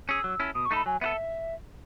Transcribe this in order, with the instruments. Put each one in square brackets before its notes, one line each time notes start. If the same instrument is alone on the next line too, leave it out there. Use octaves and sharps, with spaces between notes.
[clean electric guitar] C#4 G#4 [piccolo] E6
[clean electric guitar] F#3
C#4 E4 A4
[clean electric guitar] B2 [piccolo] D#6
[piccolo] C#6
[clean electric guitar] A3 D#4 A4 [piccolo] B5
[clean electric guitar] F#3 [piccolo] G#5
[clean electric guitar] B3 F#4 A4 [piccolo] E5